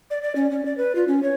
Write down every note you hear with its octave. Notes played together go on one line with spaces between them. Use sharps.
D5
D5
C#4
C#4
D5
B4
F4
C#4
C#5